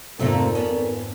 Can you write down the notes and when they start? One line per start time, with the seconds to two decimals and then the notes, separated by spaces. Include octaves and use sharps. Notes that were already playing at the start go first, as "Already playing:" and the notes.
0.19 G#1 F2 C3 A3 A#3 A4 A#4 D5
0.55 B3 C#4